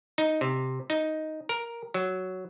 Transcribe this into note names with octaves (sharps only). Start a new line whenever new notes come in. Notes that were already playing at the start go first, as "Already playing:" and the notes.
D#4
C3
D#4
A#4
F#3